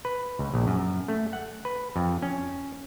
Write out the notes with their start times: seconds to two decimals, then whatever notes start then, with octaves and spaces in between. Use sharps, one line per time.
0.05 B4
0.39 C#2
0.54 A#1
0.67 F#2
1.08 A3
1.33 F#5
1.65 B4
1.96 F2
2.22 C#4